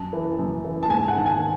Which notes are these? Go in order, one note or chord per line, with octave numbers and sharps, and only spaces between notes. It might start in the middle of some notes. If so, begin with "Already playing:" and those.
Already playing: F#2 A5
E3
F#2
E3
A5
G#2 G#5
F#5
D#3 A5
G#5